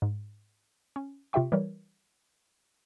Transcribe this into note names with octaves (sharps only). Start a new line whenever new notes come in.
G#2
C#4
C3 F4 G4 E5 G5 C#6
E3 G3 A#4 C#5